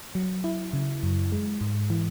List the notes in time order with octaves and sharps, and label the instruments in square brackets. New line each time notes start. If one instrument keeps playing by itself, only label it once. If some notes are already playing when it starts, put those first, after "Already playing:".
[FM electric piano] F#3
E4
C#3
F#2
G#3
G#2
E3